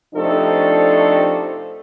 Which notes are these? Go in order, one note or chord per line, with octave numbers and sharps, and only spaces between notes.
C3 F3 A3 D4 D#4 A4